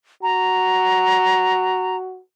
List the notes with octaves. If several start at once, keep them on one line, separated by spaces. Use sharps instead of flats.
F#4 A#5